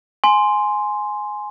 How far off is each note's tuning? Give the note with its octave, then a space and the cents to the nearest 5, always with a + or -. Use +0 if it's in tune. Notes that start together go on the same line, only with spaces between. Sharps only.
G#5 +10 C6 +0